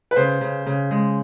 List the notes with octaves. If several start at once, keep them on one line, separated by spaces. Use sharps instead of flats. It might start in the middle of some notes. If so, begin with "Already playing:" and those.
B4
C#3 C5
C#3
C#3
G#3